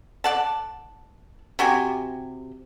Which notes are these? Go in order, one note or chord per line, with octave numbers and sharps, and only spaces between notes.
D5 F#5 A5
C3 F#4 G4 G#5